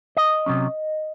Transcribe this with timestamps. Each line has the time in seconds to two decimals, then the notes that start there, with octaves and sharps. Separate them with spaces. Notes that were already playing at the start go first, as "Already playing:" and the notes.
0.17 D#5
0.46 C3 F#3 C#4